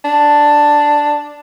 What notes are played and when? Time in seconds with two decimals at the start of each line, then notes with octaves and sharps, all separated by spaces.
0.04 D4